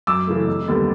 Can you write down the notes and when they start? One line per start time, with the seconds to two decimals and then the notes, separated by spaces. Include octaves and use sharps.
0.07 F#2 D6 E6
0.27 C#3 E3 A3
0.47 F1
0.68 D#2 D3 G3 B3